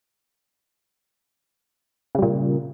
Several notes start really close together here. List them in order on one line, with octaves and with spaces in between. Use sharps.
C#3 G3 A#2